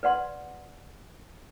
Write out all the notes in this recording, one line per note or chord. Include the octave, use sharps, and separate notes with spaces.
B4 D5 F#5 C6